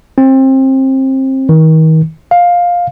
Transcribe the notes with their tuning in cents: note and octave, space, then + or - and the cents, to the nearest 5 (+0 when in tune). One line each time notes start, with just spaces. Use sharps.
C4 +25
D#3 +35
F5 +10